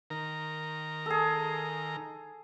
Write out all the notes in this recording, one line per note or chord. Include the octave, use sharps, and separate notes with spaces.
D#3 A#4 A#5
G#4 A4